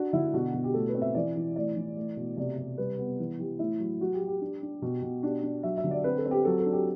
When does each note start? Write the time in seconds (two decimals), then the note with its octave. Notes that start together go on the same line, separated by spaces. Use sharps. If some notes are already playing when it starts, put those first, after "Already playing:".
Already playing: D4 F#4
0.13 D3 E4
0.34 B2 F#4
0.54 B2
0.64 G4
0.74 A2 A4
0.88 B4
0.95 C4
1.02 E5
1.14 E3 D5
1.36 E3
1.56 A2 D5
1.76 E3
1.97 A3
2.17 B2
2.37 C3 D5
2.58 C3
2.78 G3 B4
2.98 B3
3.19 E3
3.39 E3 G4
3.59 A2 E4
3.80 F#3
4.01 F#3 F#4
4.14 G4
4.21 F#3
4.27 G4
4.41 D4
4.62 D4
4.82 B2
5.02 B2
5.23 D4 G4
5.43 D4
5.63 F#3 E5
5.77 E5
5.84 D3
5.91 D5
6.04 C4 B4
6.18 A4
6.26 C4
6.31 G4
6.45 F#3 A4
6.59 A4
6.66 D4
6.73 G4